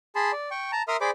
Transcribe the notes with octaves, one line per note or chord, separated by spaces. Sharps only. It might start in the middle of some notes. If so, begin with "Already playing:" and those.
G#4 A5 B5 C6
D5
G5 C#6
A5 A#5
A#4 E5 C6 D#6 F6
G#4 C5 D5 B5 D6